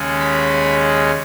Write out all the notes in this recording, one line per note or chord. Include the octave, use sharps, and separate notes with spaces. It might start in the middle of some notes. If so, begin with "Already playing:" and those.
Already playing: D#2 C#3 G#3 C#4
B5